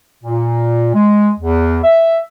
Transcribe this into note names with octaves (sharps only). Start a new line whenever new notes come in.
A#2
G#3
E2
E5